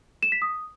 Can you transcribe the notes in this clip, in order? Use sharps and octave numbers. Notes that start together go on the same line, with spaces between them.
E7
B6
D#6